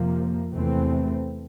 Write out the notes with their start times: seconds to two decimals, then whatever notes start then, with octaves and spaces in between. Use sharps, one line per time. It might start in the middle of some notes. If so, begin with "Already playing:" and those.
Already playing: F2 C3 F3 A#3
0.51 E2 C3 E3 A3 C4